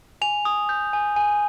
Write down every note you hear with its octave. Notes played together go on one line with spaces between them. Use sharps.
G#5 F7
D#6
G6
G#5
G#5